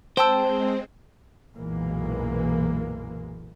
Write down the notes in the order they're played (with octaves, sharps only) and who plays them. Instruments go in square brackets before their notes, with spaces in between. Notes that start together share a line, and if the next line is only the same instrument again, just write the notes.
[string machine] G#3 C4 [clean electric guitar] C5 [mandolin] G5 A5 E6
[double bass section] B1 F#2 A#2 E3 G#3 A#3